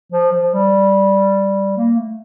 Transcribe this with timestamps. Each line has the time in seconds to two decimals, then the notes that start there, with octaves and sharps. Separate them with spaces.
0.12 F3
0.32 F3
0.53 G3
1.77 A#3
1.97 A3